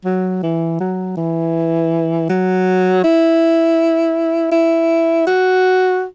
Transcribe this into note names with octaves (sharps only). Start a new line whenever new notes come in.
F#3
E3
F#3
E3
F#3
E4
E4
F#4